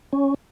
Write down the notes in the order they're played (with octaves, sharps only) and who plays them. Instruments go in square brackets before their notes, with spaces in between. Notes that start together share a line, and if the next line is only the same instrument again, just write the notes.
[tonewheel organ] C#4